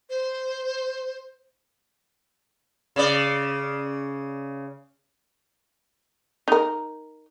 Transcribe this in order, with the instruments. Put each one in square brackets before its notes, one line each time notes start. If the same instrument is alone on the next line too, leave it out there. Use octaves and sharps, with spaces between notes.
[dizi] C5
[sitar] C#3 D5
[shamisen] D#4 A#4